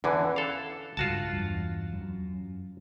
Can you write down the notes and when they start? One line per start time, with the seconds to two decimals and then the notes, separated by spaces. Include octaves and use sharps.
0.04 E2 D3 E3 C#4
0.36 A4 F5
0.97 C#2 G2 F4 F#4 A5
1.33 E2 G2
1.93 F#2